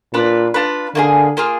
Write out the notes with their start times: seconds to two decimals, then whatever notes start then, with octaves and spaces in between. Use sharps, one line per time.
0.13 A#2 D4 F4 B4
0.54 D4 F4 B4
0.95 D3 A#3 F4 G#4
1.37 A#3 F4 G#4